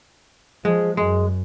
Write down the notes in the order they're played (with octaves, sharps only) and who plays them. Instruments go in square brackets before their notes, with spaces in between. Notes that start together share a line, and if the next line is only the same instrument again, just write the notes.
[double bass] F3 [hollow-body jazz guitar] G#3
[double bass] F#2 [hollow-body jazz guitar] G#3